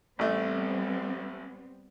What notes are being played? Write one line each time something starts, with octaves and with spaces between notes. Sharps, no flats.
A1 G3 A3 B3 C4